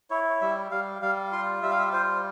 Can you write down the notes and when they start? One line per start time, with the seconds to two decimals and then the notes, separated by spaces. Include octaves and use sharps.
0.10 E4 C#5
0.30 C#5
0.41 G3 E5
0.71 G3 F5
1.02 G3 F5
1.32 F4 C6
1.63 G3 E5
1.71 F5
1.79 E5
1.93 F4 C5